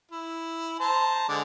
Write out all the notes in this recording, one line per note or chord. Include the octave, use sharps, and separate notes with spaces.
E4
C5 A5 A#5
D3 G#3 D5